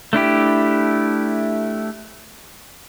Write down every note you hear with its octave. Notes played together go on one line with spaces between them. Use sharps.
A3 D4 E4 G4